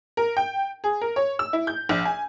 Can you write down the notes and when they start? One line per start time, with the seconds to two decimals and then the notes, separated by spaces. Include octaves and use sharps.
0.17 A#4
0.37 G5
0.84 G#4
1.01 A#4
1.16 C#5
1.39 E6
1.53 E4
1.67 G6
1.89 A#1
2.05 G#5